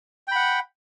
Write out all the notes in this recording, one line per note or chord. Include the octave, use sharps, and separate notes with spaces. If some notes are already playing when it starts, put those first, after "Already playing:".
F#5 G5 B5